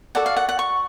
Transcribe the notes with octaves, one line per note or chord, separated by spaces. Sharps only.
F#4 A4 D5 F#5
F5
F#5
F#5
C#6